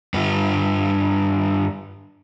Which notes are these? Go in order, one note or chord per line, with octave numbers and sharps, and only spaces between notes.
G2 B3